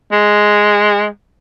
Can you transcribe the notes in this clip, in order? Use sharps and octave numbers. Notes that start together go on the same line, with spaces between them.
G#3